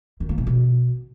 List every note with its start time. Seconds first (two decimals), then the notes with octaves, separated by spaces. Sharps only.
0.20 D#3
0.29 A#3
0.38 A2
0.47 B2